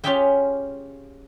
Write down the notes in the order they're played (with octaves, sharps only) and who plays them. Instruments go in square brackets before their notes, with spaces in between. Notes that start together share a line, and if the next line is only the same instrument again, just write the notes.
[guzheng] C#4 F4 G4 G#4 E5 G5